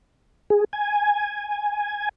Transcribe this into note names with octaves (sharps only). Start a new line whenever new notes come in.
G#4
G#5